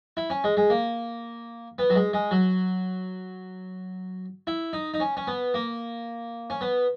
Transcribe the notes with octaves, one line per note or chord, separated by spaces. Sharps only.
E4
C#4
G#3
G#3
A#3
B3
F#3
G#3
G#3
F#3
E4
D#4
D#4
C#4
C#4
B3
A#3
C#4
B3